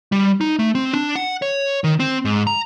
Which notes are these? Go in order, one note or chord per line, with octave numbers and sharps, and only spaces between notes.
G3
D#4
A3
C4
D4
F#5
C#5
D#3
C4
G#2
A#5